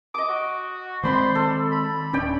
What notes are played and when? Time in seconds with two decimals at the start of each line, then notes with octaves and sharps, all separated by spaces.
0.14 D#5 D6 D#6
0.28 F#4
1.03 D#3 G#3 C4 C5 D5 B5 C6
1.35 A4
1.72 B5
2.13 D1 C#4 D4 C#5 D5 G5